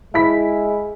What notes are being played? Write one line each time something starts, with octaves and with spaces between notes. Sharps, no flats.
G#3 E4 B5 B6